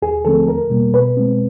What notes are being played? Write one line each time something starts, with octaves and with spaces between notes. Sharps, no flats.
D#2 G#4
D3 F3 A3 C4 A4
E2 A#4
B2 G3 A#3
B2 B4
G#3 C4